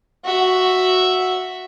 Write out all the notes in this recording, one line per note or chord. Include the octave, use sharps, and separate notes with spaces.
F#4 E5